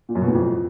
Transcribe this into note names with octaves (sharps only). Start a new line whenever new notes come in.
A#2
F#2
B2
A2
F2